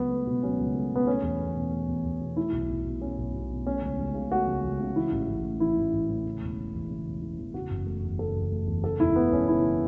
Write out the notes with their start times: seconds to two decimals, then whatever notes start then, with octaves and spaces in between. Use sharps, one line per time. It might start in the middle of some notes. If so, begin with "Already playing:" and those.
Already playing: C#2 F#3 B3
0.10 A3
0.27 B2
0.43 F#3 C#4
0.59 C#2
0.75 A3
0.91 B2 B3
1.07 A3 C#4
1.23 E2
1.40 E2
1.55 B2
1.72 A3
1.88 E2
2.04 E2
2.21 B2
2.36 A3 E4
2.52 B1
2.69 B1
2.86 B2
3.01 A3 C#4
3.18 B1
3.34 B1
3.51 B2
3.67 A3 C#4
3.82 C#2
3.99 C#2
4.14 C#3
4.32 A3 F#4
4.47 C#2
4.64 C#2
4.80 C#3
4.95 E3 E4
5.12 A1
5.29 A1
5.44 A2
5.60 E3 E4
5.77 A1
5.93 A1
6.09 A2
6.25 C#3
6.42 E1
6.58 E3
6.74 E2
6.89 C#3
7.06 E1
7.22 E3
7.39 E2
7.54 C#3 F#4
7.70 F#1
7.86 A3
8.03 E2
8.19 C#3 A4
8.36 F#1
8.51 A3
8.67 E2
8.84 C#3 A4
9.00 E1 E4
9.16 A3 B3
9.32 E2 C#4
9.48 C#3 E4